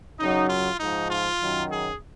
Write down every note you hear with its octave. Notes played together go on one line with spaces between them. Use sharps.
F#2 C#3 F#3 D#4
F4
G#2 F3 D#4
F4
F#2 D#3 F#3
G#4